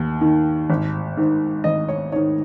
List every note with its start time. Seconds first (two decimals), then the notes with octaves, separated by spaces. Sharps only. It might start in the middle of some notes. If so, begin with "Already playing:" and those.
Already playing: D#2
0.21 D#3
0.70 G#1
1.17 G#2 D#3
1.64 G#1 D#5
1.89 C#5
2.12 G#2 D#3 C#5